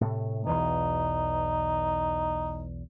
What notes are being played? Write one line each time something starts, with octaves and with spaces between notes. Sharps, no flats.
A2 C3 A3
B1 E2 E3 D#4